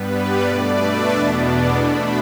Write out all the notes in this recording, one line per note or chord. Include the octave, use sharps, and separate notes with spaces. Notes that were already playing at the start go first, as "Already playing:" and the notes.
Already playing: G2 G3 B3 B4
D5
B2 A3 D4 D5
B4 E5
E2 B2 B3 D4 D5
D5
B2 A3 D4 B5 E6